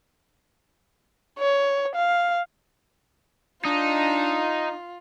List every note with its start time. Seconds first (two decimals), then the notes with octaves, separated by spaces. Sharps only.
1.39 C#5
1.95 F5
3.65 D4 D#4 F4